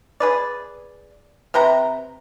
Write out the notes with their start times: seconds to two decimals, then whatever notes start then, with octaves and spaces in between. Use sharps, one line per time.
0.20 G#4 B4 D5
1.54 C3 B4 G5 A#5